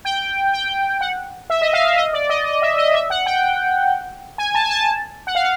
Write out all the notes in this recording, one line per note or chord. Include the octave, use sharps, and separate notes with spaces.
G5
G5
F#5
E5
D#5
F5
E5
D#5
D5
D#5
D#5
E5
D#5
E5
F#5
G5
G#5
A5
G#5
A5
F#5
F5